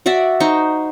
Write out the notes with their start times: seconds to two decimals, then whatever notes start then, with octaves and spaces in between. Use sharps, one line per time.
0.06 F#4 D5 E5 F#5
0.40 D#4 C5 C#6